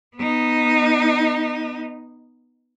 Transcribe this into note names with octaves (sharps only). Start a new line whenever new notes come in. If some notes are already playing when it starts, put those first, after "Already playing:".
B3 D#4